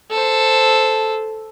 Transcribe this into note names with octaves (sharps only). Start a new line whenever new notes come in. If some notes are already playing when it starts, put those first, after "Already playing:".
A4 C5